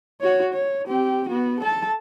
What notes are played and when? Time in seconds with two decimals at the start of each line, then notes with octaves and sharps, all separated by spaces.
0.21 F#4 C#5
0.53 C#5
0.87 C4 G4
1.29 B3 F#4
1.61 A4 A5